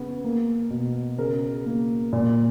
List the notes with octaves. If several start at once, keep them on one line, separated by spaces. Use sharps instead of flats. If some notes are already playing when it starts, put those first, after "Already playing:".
Already playing: C#3 B3
A#3
B2
C#3 A#4
A#3
A#2